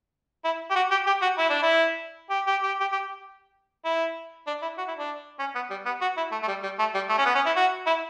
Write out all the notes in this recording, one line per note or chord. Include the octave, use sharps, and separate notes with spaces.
E4
G4
F#4
G4
G4
F#4
E4
D4
E4
G4
G4
G4
G4
G4
E4
D4
E4
F#4
E4
D4
C#4
B3
G3
B3
F#4
E4
A3
A3
G3
G3
A3
G3
A3
C#4
B3
C#4
E4
F#4
E4